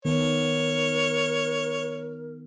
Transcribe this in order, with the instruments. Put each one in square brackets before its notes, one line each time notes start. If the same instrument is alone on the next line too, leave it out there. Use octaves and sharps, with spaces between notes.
[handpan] D#3 B3 [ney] A#4 [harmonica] C#5